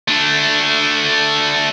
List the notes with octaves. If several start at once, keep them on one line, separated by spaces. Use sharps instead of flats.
A3 D4